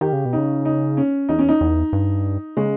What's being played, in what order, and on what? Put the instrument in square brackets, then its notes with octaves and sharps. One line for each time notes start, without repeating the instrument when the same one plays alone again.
[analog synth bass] D#3 [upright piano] G4
[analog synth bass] C#3
B2
[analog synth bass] C#3 [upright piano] D#4
[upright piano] D#4
C#4
[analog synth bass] E2 [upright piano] D#4
[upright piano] C#4
D#4
[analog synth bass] E2
G2
[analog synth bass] C#3 [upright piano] G#3